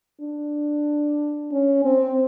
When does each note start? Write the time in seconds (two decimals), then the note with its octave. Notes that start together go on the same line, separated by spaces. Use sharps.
0.21 D4
1.52 C#4
1.85 C4